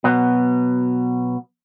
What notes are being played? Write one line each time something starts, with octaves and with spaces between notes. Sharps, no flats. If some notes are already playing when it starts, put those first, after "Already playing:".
B2 F#3 B3